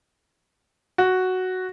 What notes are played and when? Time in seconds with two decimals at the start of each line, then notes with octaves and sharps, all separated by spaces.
0.98 F#4